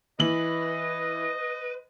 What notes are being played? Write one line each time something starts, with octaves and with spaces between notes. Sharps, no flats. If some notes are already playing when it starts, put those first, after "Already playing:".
E3 B4 D#5 F#7